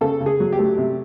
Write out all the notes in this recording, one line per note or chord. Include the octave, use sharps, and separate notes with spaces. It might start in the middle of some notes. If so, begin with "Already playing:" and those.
C#3 A4
C#3
G#4
F#3
G4
A3
C3